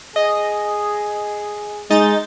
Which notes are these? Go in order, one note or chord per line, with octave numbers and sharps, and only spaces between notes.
G#4 D#5
G#3 D#4 G6 A6